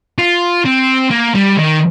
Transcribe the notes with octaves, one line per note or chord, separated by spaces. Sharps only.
F4
C4
A#3
G3
D#3